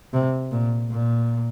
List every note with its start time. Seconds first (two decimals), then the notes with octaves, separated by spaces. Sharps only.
0.13 C3
0.51 A#2
0.90 A#2